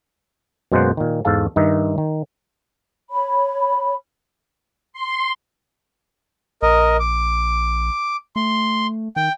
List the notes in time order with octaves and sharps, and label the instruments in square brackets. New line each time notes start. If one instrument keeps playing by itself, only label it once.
[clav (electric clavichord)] F#2 B2 G#3 A#3 C5 F#5
A#2 D#3
E2 G#2 A4 F5 A5
G2 D#3 D#4 D#5 E5
D#3
[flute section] C#5 B5
[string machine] C6
[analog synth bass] A#1 [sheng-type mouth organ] A#4 D#5
[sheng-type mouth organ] D6
[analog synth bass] A3 [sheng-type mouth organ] C6
[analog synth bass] D#3 [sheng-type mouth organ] G5